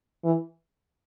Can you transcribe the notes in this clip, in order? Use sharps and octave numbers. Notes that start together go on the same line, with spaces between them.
E3